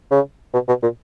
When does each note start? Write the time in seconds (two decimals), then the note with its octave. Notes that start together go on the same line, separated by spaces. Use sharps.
0.11 C#3
0.53 B2
0.68 B2
0.82 A#2